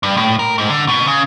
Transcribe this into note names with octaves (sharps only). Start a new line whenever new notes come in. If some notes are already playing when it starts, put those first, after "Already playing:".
G2
A2
A#4
G#2
D3
B2
C#3